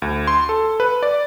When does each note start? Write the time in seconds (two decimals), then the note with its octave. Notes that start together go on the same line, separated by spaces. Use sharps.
0.02 D2
0.27 C6
0.49 A4
0.80 B4
1.03 D5